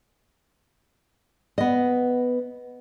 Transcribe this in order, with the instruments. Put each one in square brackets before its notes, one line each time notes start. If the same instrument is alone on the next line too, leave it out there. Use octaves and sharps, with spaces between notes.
[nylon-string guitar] B3 D#5